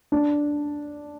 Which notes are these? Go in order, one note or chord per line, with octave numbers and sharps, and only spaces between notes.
D4